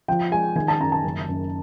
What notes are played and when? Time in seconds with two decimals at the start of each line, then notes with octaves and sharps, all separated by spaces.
0.08 F3 G5
0.32 G#3 G#5
0.55 D#3 G#5
0.68 A5
0.80 F#2 A#5
0.92 A5
1.04 F#1
1.28 F#1